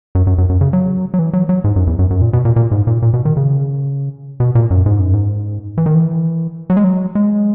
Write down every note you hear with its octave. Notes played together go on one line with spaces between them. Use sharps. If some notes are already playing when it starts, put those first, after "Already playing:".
F#2
F#2
F#2
F#2
C#3
F#3
F#3
E3
F#3
F#3
G#2
F#2
E2
F#2
F#2
A#2
B2
A#2
A#2
G#2
A#2
A#2
B2
D#3
C#3
B2
A#2
F#2
G#2
F#2
G#2
E3
D#3
E3
F#3
G#3
F#3
G#3